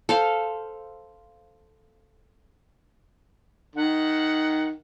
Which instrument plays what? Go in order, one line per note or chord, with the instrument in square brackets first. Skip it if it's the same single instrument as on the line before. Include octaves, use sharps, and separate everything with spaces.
[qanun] A4 C5 F5
[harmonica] D#3 [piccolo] F#5